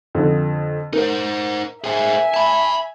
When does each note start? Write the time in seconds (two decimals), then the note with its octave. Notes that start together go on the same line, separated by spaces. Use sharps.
0.15 F2 D3
0.93 D#4 A#4 C5
1.84 G#4 C5 E5 G#5
2.34 A5 B5